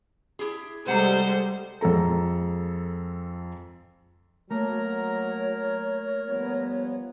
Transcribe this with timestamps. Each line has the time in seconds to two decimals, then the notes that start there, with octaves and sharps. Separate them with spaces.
0.39 E4 G4 G#4
0.86 C3 G3 G#3 A4 C5 F#5 A#5
1.81 F2 G#3 A4 A#5
4.51 F#3 A3 A#3 A#4 C#5 A#5
6.28 F3 G3 B3